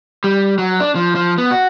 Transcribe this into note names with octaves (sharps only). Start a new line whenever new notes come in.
G3
F#3
D4
F3
F3
B3
F#4